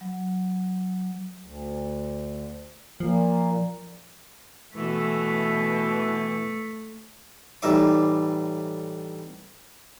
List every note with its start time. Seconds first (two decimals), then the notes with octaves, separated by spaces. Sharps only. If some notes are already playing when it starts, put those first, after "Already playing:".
0.01 F#3
1.44 D2
3.00 A#2 F3 A#3
4.76 B2 E3 A3
7.62 A2 E3 G3 D#4 E5 D6